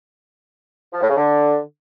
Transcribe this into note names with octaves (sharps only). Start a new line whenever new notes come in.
F3
A2
C#3
D3